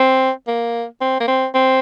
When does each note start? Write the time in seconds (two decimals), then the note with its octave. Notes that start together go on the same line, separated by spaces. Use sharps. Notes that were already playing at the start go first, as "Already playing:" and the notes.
Already playing: C4
0.48 A#3
1.01 C4
1.20 A#3
1.28 C4
1.55 C4